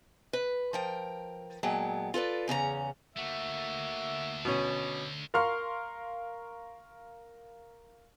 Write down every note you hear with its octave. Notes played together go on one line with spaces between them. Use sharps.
B4
F3 A#4 G5
A#2 F#3 G#3 B3 G5 A5
F4 A4 B4 D5
E2 C#3 C#4 A#5
D3 A3 A#3 F#4 E5
B2 C#4
A#4 F5 C6 C#6 F6